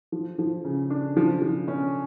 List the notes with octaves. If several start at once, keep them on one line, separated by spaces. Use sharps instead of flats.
F3
F3
C#3
D4
F3
F3
C#4